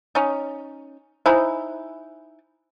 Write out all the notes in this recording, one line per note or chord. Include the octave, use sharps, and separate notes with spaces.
C#4 D#4
D#4 E4 C5 G#5